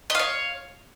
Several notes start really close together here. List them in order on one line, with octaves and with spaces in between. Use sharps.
D#5 F5 C#5